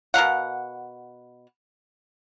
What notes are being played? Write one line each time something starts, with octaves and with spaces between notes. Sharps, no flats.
B2 A#4 F5 F#5